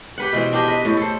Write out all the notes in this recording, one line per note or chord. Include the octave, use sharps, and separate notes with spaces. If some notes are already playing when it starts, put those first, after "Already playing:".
G4 B4 F#5
B2 E3 C4
D4 G4 D#5
B4 D#5
A2
A4 C5